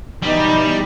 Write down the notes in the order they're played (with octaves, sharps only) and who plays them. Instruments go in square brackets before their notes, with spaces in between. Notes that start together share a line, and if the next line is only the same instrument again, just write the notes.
[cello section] B2 E3 D#4 [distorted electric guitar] G3 G4